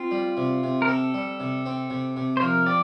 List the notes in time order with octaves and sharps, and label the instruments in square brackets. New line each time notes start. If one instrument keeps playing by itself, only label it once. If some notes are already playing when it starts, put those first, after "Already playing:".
Already playing: [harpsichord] C4 [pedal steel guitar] F4
[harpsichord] G3
C3
C3
[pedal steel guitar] A#4
[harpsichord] C4 [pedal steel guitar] A4
[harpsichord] G3
C3
C4
C3
C3
[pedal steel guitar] C5
[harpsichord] F3 [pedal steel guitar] A#4
[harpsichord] C4 [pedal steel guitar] D5